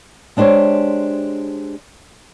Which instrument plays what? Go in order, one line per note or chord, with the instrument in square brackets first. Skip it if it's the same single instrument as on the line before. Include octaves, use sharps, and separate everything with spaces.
[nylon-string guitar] G#3 D4 G4 C5 C#5